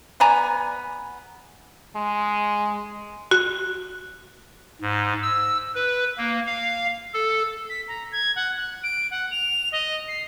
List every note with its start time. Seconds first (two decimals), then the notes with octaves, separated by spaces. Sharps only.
0.20 B3 D5 G#5 A#5
1.96 G#3
3.31 F#4
4.82 G#2
5.23 E6
5.75 B4
6.18 A#3
6.47 F5
7.14 A4
7.70 B6
7.88 A#5
8.12 G#6
8.36 F#5
8.57 F#6
8.83 D7
9.11 F#5
9.31 F7
9.72 D#5
10.08 C7